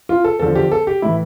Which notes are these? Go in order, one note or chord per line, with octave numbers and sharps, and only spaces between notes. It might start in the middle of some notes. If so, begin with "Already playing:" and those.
F4
A4
E2 D3 F3 A4
G4
A4
G4
A2 E3 E4